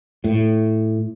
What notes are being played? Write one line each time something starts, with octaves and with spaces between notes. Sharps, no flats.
A2